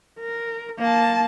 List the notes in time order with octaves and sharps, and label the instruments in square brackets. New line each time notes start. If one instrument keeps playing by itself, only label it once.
[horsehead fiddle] A#4
A#3 A5